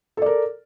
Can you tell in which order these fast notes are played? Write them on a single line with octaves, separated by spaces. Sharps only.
A4 D5 A#4